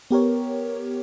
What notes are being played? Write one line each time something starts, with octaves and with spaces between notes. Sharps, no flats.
B3 G4 A#4 C#5